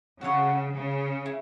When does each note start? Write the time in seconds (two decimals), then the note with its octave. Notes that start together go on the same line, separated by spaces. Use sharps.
0.21 C#3 F#4 A4 C#5 F#5
0.73 C#3
1.26 E4